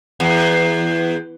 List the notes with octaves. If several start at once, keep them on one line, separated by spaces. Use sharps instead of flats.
E2